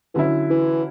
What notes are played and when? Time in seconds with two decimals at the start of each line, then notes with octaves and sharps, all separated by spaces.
0.14 D3 E3 F#3 C#4 E4
0.50 E3